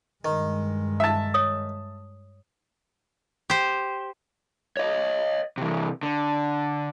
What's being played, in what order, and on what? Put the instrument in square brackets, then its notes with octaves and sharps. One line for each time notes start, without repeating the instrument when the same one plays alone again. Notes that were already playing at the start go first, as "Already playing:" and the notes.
[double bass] G2 G#3 [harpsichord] D#3
[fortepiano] E5 A5
[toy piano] C#5 D#6
[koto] G4 C5
[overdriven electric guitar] C#5 D#5
C3 E3
D3